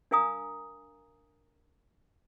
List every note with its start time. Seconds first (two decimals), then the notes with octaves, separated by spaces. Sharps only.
0.11 D4 A#4 F5 G#5 A#5 D#6